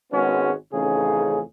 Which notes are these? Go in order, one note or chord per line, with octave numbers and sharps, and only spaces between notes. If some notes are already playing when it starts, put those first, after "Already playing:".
G#1 G#3 B3 C#4 F#4
A1 F2 C#3 D#4 G#4